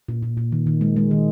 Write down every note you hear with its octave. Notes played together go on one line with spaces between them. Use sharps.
A#2
A#2
A#2
D#3
D#3
G#3
G#3
D#3